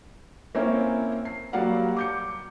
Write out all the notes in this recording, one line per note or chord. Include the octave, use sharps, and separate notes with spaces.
A#3 C4 C#4 E4 C#5
C7
F#3 G3 A#3 D5 F5 F#5
D6 G6 C#7